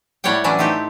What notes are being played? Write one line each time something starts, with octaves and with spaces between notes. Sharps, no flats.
A2 G3 C#5 D5 F#5 G5
E3 F#3 C#4 D4 E4
A3 C4 D#4 G4 A4